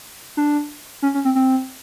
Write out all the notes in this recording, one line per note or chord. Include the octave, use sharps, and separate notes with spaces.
D4
C#4
C#4
C4
C4